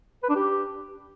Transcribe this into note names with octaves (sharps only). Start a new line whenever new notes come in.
B4
D4
G4